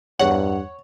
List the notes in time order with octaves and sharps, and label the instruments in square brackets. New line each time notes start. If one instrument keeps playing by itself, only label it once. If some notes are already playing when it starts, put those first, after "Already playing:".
[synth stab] E2 F#5 [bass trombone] G2 [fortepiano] C#5